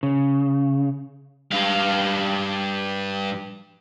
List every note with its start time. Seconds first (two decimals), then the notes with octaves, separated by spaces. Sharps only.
0.03 C#3
1.51 G2 F5